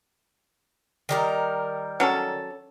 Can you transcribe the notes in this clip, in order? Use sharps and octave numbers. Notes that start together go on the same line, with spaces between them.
D#3 G3 A#4
F#3 C#4 A4